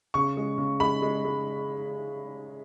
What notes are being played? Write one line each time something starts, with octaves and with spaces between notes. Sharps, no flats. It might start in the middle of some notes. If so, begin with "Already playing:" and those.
C#3 C#6
G#3
C#3
G#3 B5
G#3
G#3